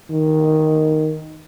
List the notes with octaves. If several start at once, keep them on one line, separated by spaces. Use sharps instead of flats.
D#3